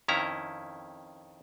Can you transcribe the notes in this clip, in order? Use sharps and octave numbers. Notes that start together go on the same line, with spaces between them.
F2 D#3 C#4 E4 A#5